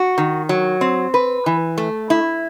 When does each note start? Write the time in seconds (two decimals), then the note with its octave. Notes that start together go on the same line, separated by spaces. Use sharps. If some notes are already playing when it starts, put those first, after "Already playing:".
Already playing: F#4
0.18 D#3
0.49 F#3
0.81 C4
1.14 B4
1.46 E3
1.78 A3
2.10 E4